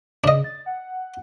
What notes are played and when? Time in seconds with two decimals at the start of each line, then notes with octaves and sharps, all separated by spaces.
0.24 C#3 D4 D#5
0.44 A6
0.66 F#5